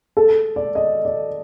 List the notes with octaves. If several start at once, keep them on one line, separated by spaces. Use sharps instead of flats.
A4
D5
D#5
D5